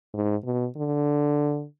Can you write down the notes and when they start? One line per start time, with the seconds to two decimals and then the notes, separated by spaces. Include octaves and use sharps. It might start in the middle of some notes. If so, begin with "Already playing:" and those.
0.14 G#2
0.44 B2
0.77 D3